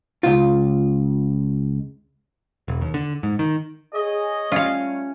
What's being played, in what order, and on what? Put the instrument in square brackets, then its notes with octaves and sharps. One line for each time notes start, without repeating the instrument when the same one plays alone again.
[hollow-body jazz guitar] C#2 F4
[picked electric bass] E1
D#2
D3
G#2
D#3
[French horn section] G#4 [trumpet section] C#5 D#5
[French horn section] G3 A3 [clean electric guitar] C#4 [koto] F4 F5